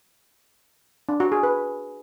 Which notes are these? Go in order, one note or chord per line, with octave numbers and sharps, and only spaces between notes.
D4
F#4
G#4
B4